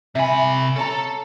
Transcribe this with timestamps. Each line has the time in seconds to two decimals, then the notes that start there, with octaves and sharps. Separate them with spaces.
0.15 C3 E5 G#5 B5
0.76 C#4 A4 A5 A#5